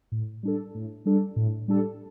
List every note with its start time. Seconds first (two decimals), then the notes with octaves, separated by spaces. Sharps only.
0.12 A2
0.43 G3 D4 A4
0.75 A2
1.05 G3 D4 A4
1.36 A2
1.68 G3 D4 A4